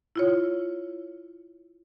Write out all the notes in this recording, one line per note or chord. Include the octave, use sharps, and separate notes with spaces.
E4 F4 C#5